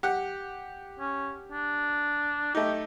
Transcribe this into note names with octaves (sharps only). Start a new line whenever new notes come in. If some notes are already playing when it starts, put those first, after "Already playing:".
G4 F#5
C#4
D4
A3 D#4 G4